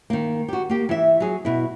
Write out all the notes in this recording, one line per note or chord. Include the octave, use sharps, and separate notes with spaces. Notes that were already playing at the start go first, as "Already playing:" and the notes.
D#3 A#3
F#4 G4
A#3 G4
E3 E5
F#3 G#4
B2 E4